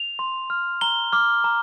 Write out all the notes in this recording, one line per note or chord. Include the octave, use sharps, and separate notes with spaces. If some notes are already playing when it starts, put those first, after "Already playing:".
Already playing: F7
C6
F6
A#5 G7
D6 F6
A#5